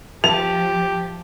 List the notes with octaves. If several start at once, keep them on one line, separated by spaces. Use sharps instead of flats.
F3 G4 A5 F7